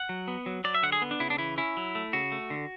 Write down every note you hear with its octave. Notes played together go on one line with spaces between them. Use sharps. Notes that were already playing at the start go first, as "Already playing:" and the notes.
Already playing: F#5
F#3
B3
F#3
F#3 D5
E5
D3 F#5
G#4
B3
D4
C#3 E4
D4
E3 E4
C#4 E4
F#3
A3
C#3 F#4
A3
D3